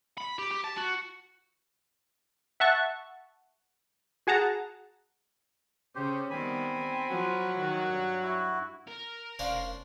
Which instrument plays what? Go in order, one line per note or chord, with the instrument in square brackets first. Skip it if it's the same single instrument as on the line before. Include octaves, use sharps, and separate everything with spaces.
[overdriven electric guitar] B5
G4
G4
A5
F#4
[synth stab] E5 F#5 A5 C#6
F#4 G#4 F#5 A5 A#5
[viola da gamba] C#3 C#4 [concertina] G4 C5
[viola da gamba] D#3 G3 B3 [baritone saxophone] C4 [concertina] G#5 B5
[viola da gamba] F3 [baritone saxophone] F#3
[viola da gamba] D#3
G2
[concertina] E4 F#4
[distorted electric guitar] A#4
[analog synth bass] F1 [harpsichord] C#4 D4 C5 [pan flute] F5